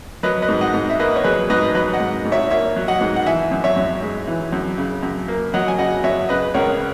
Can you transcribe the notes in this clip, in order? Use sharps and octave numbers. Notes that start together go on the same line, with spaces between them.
F#3 B4 D#5
B4 D#5
G#2
D#5 F#5
G#2
E5
A#3 B4 D#5
C#5
F#3 G#4 B4
G#2 B4 D#5
F#3 B4 D#5
D#5 F#5
G#2
G#2
C#5 E5
A#3 C#5 E5
F#3
D#5 F#5
G#2
F#5
E3 E5 G#5
F#2
C#5 E5
F#2
G#3
E3
F#2
C#3
F#2
A#3
F#3 D#5 F#5
G#5
C#3 D#5 F#5
F#2 C#5 E5
C#3 B4 D#5
C#2 A#4 C#5